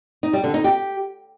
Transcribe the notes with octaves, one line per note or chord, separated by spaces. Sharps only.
D#4
G3
D3
D#4
G4